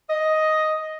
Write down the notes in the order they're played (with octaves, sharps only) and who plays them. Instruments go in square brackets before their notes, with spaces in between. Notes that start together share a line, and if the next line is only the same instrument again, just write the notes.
[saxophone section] D#5